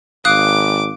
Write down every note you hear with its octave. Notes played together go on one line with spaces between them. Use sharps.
G#1 F5 D6 D#6 F#6